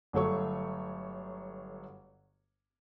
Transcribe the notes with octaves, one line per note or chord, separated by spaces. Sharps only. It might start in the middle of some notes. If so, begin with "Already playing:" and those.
G1 F#3 A3 C#5 C#6